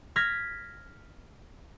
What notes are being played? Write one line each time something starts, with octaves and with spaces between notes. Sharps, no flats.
F6 G#6 A#6 B6